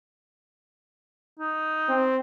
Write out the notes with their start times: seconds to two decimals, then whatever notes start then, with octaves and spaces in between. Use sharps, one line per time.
1.39 D#4
1.89 C4